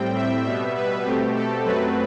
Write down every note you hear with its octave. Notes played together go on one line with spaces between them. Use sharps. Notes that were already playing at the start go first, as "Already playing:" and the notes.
Already playing: A2 G3 C4 G5
E5
B2 G3 B3 E5
B4
B2 A3 C4 G4
A4
F#2 F#3 A3 C4 B4